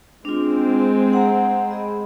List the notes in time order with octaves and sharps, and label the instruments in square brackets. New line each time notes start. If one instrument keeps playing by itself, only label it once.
[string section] G#3 C4 [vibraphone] D4 F4
[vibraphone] F#5 A#5
G#4 D#5 B5